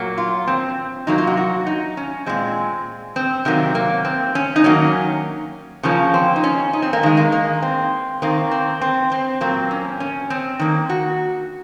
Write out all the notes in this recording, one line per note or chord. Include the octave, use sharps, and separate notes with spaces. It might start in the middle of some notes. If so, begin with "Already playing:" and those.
Already playing: A#2 F#3 A#3
F4
C4
C3 F#3 A#3 D#4
F4
F#4
F#4
D#4
C#4
A#2 G#3 C4
C4
C3 D#3 F#3 A#3 C4
A#3
C4
C#4
D#4
D#3 F#3 A#3 C#4
C#3 F3 A#3 C#4
C4
D#4
C#4
D#4
C4
A#3
D#3 G#3
A#3
A#3
C4
D#3 A#3 C4
C4
C4
C4
A#2 F#3 A#3 C4
C#4
C#4
C4
D#3 A#3
F#4